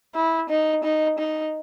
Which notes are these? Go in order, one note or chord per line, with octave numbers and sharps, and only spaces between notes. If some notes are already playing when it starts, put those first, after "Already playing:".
E4
D#4
D#4
D#4